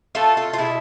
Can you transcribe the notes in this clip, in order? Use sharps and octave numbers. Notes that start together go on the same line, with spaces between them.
A3 F4 A4
F4 A4
F4
B2 E4 G#4